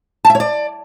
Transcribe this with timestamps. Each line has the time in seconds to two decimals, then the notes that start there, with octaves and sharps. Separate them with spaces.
0.25 A5
0.30 E5
0.35 C#5
0.40 D5